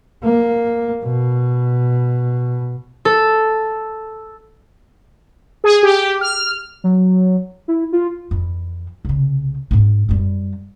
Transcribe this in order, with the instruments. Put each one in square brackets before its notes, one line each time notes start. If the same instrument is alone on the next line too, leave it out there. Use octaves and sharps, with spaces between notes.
[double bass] A#3
B2
[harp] A4
[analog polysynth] G#4
G4
F6
[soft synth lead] F#3
E4
F4
[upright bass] F2 E3
C2 C#3
G#2 A#3
F#2 G3